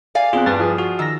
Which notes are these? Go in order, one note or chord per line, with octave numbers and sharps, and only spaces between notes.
D5 F5 G#5
E2 C4 F4 G#4 F#6
G2 B4 A6
F3 G#4
F#4
D#3 E6 A#6